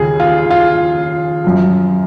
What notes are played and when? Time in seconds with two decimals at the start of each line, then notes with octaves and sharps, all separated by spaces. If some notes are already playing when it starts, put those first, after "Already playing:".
Already playing: D#2 C#3 G#4
0.20 F4
0.50 F4
1.44 F#2 F3